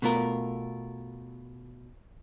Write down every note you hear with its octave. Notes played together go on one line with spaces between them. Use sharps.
B2 A3 F4 A#4